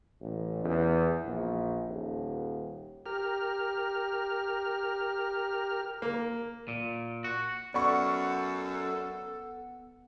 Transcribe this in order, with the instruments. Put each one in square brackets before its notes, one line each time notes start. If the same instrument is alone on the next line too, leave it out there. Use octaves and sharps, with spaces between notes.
[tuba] A1
E2
A#1
D#1
[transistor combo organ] G4 A#4 F6
[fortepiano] A#3
[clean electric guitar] A#2
F#4
[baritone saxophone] F#2 [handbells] B3 F#5 C#7 [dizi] A4 [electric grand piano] D5 B5 C#6